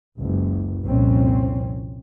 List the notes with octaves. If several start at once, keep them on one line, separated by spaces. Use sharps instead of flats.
F#1 C#2
C2 F2 A#2 C4 C#4